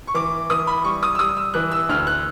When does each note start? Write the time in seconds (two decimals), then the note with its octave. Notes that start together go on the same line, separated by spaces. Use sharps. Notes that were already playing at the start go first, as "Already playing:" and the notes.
0.07 C#6
0.14 E3 D6
0.50 E3 D#6
0.67 B5
0.84 G3 C#6
1.03 D#6
1.15 E6
1.19 G3 D#6
1.37 E6
1.54 E3 F#6
1.71 E6
1.89 D2 F6
2.07 F#6